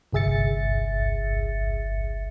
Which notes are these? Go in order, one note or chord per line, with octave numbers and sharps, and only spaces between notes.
G1 C2 G#4 E5 A6 C#7